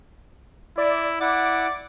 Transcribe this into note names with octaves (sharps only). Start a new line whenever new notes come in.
E4 D5
E4 D5 F#5 D6